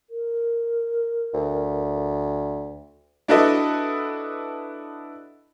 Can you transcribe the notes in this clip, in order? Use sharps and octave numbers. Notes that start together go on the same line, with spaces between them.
A#4
D2
D4 E4 F#4 A4 B4 D#5